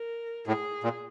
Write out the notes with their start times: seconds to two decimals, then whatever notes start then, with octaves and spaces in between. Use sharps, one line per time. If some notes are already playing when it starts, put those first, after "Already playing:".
Already playing: A#4
0.47 A2 G#4
0.83 A#2